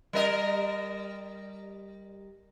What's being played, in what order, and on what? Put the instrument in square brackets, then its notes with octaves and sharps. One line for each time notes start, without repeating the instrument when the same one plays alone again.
[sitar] G3 A#4 D#5